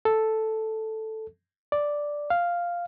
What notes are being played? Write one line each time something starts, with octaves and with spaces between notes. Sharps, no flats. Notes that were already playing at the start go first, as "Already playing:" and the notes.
A4
D5
F5